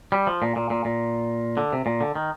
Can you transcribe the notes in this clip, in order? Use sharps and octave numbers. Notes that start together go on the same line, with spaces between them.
G3
F3
A#2
A#2
A#2
A#2
D3
C3
A#2
D3
D#3